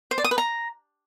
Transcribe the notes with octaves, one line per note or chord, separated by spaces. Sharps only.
C5
D5
D#6
B4
A#5